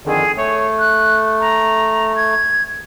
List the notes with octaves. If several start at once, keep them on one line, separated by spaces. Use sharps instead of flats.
F2 D3 D#3 G#4
A3 C#5
F#6
A#5
G#6